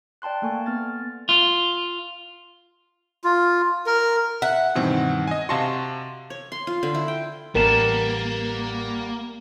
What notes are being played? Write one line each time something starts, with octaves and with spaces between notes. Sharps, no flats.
D5 G5 A5 C6 F#6
A3 A#3 A4 G#5 C#6
B3 F6 A6
F4
F4
A#4
E5 F#5
G2 B2 D#3 E3 C4
D#5 G#5
C3 F#4 D#5 F5 A5 C6
C#5
C6
F4
D3
E4
G5
A1 G3 A#3 B3 A#4 A5